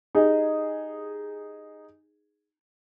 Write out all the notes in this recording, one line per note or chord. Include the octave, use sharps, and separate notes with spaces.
D#4 G4 G#4